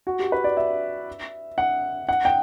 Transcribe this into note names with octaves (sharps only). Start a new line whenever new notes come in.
F#4
G4
B4
D5
E5
F#5
F#5
G5